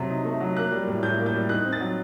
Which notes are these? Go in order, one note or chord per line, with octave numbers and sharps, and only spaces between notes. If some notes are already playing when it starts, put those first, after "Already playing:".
Already playing: C3 F#3 A3
D#4
A3
F#3
A#3 F#6
G3
A2
A2 G6
A#3
G6
G3
D#4 F#6
C4
A6
F#3